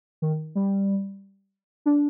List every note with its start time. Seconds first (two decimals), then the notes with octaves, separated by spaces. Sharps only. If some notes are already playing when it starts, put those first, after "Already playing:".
0.22 D#3
0.55 G3
1.86 D4